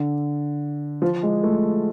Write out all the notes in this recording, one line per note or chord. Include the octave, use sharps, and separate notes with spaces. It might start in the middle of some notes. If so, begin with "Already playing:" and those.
Already playing: D3
F3
G#3
A3